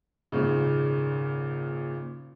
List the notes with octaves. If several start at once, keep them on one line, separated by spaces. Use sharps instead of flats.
G#1 A#2 C#3